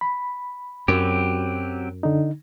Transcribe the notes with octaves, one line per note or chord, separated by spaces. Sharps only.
B5
F#2 F#3 C4 G4
D3 D#4